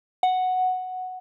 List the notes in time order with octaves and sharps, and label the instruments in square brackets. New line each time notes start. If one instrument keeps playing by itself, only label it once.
[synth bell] F#5